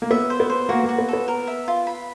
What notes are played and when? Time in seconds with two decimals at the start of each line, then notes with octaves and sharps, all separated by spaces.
0.02 A#3
0.11 B3 E5
0.30 C5
0.40 B3
0.50 C5
0.69 A#3 F#4
0.84 A#3 F#4
0.98 B3
1.08 B3 A4
1.28 A#4
1.47 E5
1.68 F4
1.87 B5